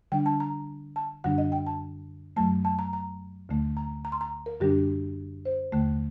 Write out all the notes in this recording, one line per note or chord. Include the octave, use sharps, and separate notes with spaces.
D3 G3 D4 G5
A5
A#5
A5
F#2 D3 G3 D4 F#5
D#5
G5
A5
F#2 F#3 A3 A5
A5
A#5
A#5
D2 D3 A3
A#5
A#5
C6
A#5
A#4
F#2 D3 G3 D4 G4
C5
D#2 D3 A3